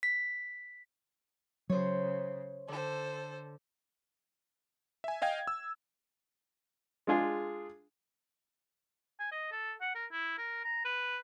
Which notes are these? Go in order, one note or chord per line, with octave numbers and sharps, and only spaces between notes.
B6
C#3 F#3 C5 C#5
D3 A4 C5
E5 G#5
D#5 F5 G5 G#6
E6
G#3 D4 F4 G#4
G#5
D#5
A4
F#5
A#4
E4
A#4
A#5
B4